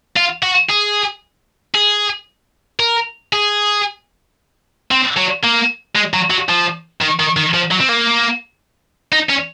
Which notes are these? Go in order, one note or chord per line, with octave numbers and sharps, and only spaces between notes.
F4
F#4
G#4
G#4
A#4
G#4
C4
F#3
A#3
G#3
F#3
F#3
F3
D#3
D#3
D#3
F3
F#3
C4
A#3
D#4
C#4